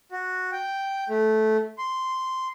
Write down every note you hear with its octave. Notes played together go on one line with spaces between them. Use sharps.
F#4
G5
A3
C6